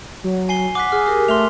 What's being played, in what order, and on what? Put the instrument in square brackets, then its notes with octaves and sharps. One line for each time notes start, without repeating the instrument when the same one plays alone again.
[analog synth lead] F#3
[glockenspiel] G#5 C7 G7
[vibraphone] F#5 [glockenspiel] D6 F#6 B6
[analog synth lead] G#4 [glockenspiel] F6
[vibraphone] G4 A#4
[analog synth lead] A3 [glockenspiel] C6 F6 F7